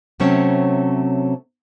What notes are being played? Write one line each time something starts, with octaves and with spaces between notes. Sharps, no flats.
C3 F#3 A3 C4 C#4 C#5